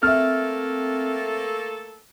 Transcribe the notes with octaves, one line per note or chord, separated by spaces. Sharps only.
A3 A#3 C4 A4 E5 F6